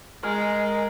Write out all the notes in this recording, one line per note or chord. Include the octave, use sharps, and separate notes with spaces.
G#3 A#4